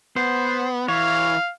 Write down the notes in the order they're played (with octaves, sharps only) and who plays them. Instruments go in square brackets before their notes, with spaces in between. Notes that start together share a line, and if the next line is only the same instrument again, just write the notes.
[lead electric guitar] B3 [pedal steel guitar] C5
[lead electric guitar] E3 [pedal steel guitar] C#5 [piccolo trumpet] F5